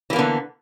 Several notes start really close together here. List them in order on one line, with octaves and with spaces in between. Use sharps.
E3 A#3 B3 D3